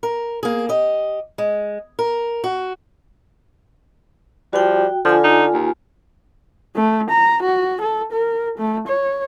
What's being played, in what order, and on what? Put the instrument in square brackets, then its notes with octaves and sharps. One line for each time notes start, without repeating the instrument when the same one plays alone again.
[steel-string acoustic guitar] A#4
A#3 G#4
G4 D#5
G#3
A#4
F#4
[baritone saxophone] F3 [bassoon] G3 [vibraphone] F#4 G5
[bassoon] D3 [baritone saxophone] F3 [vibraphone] F4 G#5
[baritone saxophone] D#4
D#2
[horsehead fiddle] A3
A#5
F#4
A4
A#4
A3
C#5